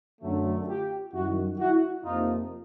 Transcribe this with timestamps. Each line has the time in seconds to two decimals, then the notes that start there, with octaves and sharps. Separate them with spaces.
0.22 F#2 D3 F#3 A3
0.68 F4 G4
1.13 F#2 D#3 G3 E4 F#4
1.58 E4 F#4
2.04 F2 C3 F3 A#3 D#4 F4